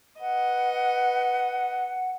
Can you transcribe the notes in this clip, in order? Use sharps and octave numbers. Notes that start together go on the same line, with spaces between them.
B4 D#5 F#5